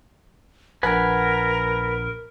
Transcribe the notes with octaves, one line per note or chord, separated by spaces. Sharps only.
A#1 A#4 B4 F#5 G#5